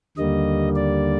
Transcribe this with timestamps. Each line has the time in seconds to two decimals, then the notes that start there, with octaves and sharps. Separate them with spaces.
0.18 D#2 D3 G3 A#3 D#5
0.76 D5